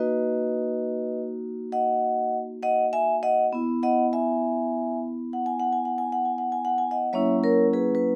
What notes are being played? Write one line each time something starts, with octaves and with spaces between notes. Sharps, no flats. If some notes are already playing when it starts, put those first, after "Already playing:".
Already playing: A#3 D#4 F#4 B4 D#5
D#5 F#5
D#5 F#5
E5 G#5
D#5 F#5
B3 E4
D#5 F#5
E5 G#5
F#5
G#5
F#5
G#5
F#5
G#5
F#5
G#5
F#5
G#5
F#5
G#5
D#5 F#5
F#3 A#3 C#4 E4 C#5 E5
A#4 C#5
G#4 B4
B4